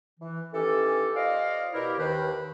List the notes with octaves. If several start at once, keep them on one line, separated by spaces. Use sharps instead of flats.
E3
D#3 E3 C#4 G4 A4
F4 C5 D5 D#5 F5
B2 E4 G4 A#4
D#2 D#3 B4 C5